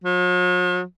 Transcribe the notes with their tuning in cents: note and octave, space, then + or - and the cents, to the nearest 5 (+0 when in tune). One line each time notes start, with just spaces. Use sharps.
F#3 -45